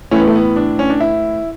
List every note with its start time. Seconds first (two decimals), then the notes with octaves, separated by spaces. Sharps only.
0.11 A2 E3 A3 C#4
0.19 B3
0.28 A3
0.36 B3
0.56 D4
0.79 C#4
0.90 D4
1.00 E4